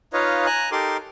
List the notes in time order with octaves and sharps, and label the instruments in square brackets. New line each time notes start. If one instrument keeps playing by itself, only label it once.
[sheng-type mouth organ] D#4 F4 B4 C#5 D#5 F5
G#5 A#5 F#6
D#4 G4 A4 A#4 C6 D6